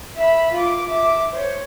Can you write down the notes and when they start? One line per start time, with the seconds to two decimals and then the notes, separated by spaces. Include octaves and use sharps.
0.16 E5 B5
0.52 F4 D6
0.88 E5 D6
1.32 C5 C#5